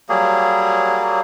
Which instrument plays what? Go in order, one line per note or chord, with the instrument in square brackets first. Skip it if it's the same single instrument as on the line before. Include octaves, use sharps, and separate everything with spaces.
[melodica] F#3 G3 A#3 G#4